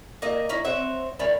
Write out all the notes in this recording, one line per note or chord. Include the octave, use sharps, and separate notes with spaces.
A#3 D#5 E5
C#4 D#4 E4
C4 C#5 E5 F#5
D#3 G3 C#4 E4